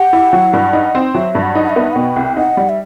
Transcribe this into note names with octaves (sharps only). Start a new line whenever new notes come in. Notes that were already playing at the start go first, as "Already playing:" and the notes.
Already playing: G4 F#5
E4
F#3
G2
D#4
C4
F#3 E5
G2
F#5
D#4
F#5
E5
B3
B2 G5
C2
D#4 F#5
G3
E5